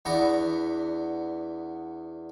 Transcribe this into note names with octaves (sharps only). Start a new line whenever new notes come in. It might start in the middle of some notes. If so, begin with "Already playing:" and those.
E2 B3 D4 A#5 C#6 D#6